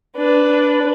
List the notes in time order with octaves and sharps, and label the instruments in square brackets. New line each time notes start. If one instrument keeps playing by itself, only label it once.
[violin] D4 B4